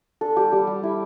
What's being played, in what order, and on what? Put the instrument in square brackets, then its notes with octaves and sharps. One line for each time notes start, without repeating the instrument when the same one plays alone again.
[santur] D4 A4
G3 G4
G3 G4
G3
E4